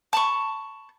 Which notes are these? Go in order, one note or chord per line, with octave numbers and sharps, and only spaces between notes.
A5 B5 C#6